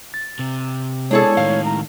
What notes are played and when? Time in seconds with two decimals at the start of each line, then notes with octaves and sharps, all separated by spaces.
0.14 A6
0.39 C3
1.11 G#3 B3 D4 E4 G#4 A4 C#5
1.37 A2 D#3 F5
1.65 A#5